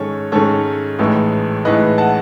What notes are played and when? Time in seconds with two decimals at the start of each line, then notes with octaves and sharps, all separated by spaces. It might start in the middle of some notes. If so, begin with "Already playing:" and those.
Already playing: G#2 D#3 G#3 C#4 A4 C#5
0.32 G#2 D#3 G#3 C#4 A4 C#5
0.99 A1 A2 E3 G#3 D#4
1.65 A1 A2 E3 G#3 D#4 B4 D#5
1.98 F#5 A5